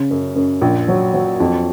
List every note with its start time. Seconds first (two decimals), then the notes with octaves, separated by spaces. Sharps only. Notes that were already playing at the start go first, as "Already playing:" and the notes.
Already playing: C#3
0.11 F#2
0.36 F#2
0.61 A#1
0.88 F#3
1.14 F#3
1.40 F2